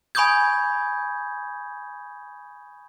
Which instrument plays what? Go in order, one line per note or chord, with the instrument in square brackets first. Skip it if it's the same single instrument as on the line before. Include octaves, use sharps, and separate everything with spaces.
[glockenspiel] G#5 B5 C#6 D#6 G6 G#6